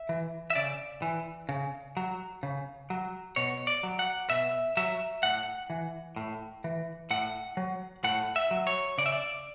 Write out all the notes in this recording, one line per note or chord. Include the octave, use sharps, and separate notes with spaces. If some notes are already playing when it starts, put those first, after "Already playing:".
Already playing: E5
E3
E5
C#3 D5
E3
C#3
F#3
C#3
F#3
B2 C#5
D5
F#3
F#5
B2 E5
F#3 E5
A2 F#5
E3
A2
E3
A2 F#5
F#3
A2 F#5
E5
F#3
C#5
C#3 D5
E5
D5